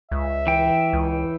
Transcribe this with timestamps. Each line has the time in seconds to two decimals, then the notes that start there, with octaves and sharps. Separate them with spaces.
0.12 C#2 E5
0.47 E3 G5
0.93 C#2